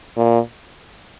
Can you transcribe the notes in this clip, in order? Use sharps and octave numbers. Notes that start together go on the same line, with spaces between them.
A#2